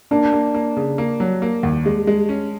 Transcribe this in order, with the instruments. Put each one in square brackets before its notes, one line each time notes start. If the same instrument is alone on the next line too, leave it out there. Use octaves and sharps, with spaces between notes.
[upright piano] A#3 [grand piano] D4
[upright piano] A#3
A#3
C#3
A#3
F#3
A#3
D#2
G#3
G#3
C#4